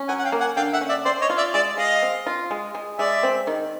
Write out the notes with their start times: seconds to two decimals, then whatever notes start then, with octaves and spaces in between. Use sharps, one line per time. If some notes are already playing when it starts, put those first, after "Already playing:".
Already playing: C#4
0.08 F#3 F#5 G#5
0.19 F#5
0.25 F5 G5
0.32 A#3
0.40 F#5 G#5
0.57 D3 F5 G5
0.73 E5 F#5
0.81 C#4
0.89 D5 E5
1.05 C4 C5 D5
1.21 C#5 D#5
1.30 F4
1.38 D5 E5
1.53 G#3 D5 E5
1.77 G#3 D#5 F5
2.02 C4
2.27 F4
2.51 G#3
2.75 G#3
2.99 G#3 D5 E5
3.23 C4
3.47 D#3